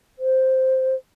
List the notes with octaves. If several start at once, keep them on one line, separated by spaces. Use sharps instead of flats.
C5